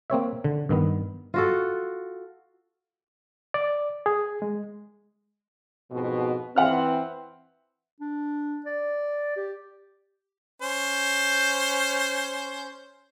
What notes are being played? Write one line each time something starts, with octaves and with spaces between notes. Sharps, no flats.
A#3 C4 C#5 E5
D3
G2 D#3 B3
F4 F#4 A4
D5
G#4
G#3
F2 G#2 B2
E3 C4 E5 F#5 F6
D4
D5
G4
C#4 C5